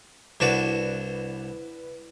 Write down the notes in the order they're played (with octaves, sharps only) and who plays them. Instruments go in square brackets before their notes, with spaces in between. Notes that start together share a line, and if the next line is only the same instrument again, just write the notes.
[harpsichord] C2 D4 F#4 [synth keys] E4 B4 D5